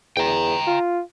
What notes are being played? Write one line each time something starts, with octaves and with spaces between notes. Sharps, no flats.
E2 G5 A#5
F4